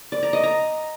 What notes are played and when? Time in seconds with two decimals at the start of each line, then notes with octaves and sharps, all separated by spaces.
0.12 D5
0.23 A#5
0.33 D#5
0.44 A#5